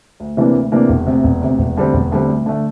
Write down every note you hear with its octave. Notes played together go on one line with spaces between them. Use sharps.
D2
C3 E3 A#3 D4
D2
C3 E3 A#3 D4
E1
D2 C3
E1
D2 C3
E1
D2 D3 G3 C4
E1
D2 D3 G3 C4
D2
D3 A3